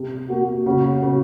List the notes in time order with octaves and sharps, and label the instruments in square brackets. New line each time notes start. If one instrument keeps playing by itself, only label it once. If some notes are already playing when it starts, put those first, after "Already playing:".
Already playing: [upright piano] C3
[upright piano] A#3 [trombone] F#4
[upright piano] C#3 [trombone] F#4
[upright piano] C#3